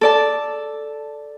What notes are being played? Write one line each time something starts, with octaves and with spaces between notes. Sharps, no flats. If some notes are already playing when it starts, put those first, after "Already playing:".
A4 D5 A5